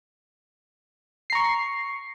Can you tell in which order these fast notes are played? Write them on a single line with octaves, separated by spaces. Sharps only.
C7 A#5 C#6